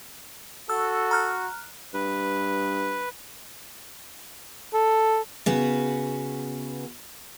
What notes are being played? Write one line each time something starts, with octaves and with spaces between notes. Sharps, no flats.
F#4 A4 E6
A#5 F6 F#6
G2 B4
A4
C#3 B3 F#4 B4